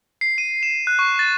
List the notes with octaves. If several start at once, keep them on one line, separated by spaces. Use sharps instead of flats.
C7
D#7
E7
F#6
C#6
A6